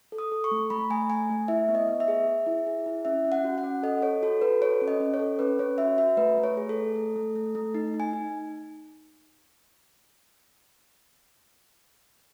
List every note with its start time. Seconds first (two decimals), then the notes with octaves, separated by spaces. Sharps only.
0.12 A4
0.18 D#6
0.32 A4
0.44 C#6
0.51 A3
0.70 A3 B5
0.90 A3 G#5
1.10 A3 G#5
1.30 A3
1.48 E4 E5
1.69 B3
1.75 D#5
1.88 B3
2.00 E5
2.08 G#4
2.28 G#4
2.46 E4
2.67 G#4
2.86 E4
3.05 C#4 E5
3.25 C#4
3.32 F#5
3.44 F#4
3.58 F#5
3.64 C#4
3.83 A4 D#5
4.02 A4 C#5
4.22 F#4 A4
4.41 F#4 B4
4.62 A4 C#5
4.81 C#4
4.88 D#5
5.00 C#4
5.14 C#5
5.19 A4
5.39 C#4 B4
5.59 C#4 C#5
5.78 F#4 E5
5.98 F#4 E5
6.17 A3 B4
6.37 A3
6.44 C#5
6.57 G#4
6.69 A4
6.76 A3
6.96 A3
7.16 A3
7.35 A3
7.55 A3
7.74 D#4
7.94 D#4
8.00 G#5
8.14 D#4